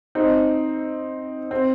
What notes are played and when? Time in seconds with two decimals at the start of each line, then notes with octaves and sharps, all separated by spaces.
0.15 C4 D#4
1.51 C4